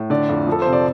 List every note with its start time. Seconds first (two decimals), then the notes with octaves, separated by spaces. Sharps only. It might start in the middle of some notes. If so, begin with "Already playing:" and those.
Already playing: A2
0.10 D3 D5
0.29 F2
0.47 F3
0.52 A4
0.62 C3 C5
0.73 D5